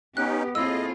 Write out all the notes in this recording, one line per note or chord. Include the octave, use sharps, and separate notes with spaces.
B3 C#4 D#4 G4 F#6
A2 A#3 C4 E4 F4 G#4 D#5 E6